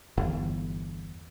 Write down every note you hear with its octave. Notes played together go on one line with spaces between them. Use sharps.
G1 E2